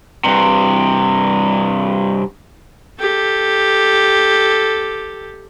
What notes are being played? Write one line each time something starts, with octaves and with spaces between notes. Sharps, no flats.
G2 C3
G4 A4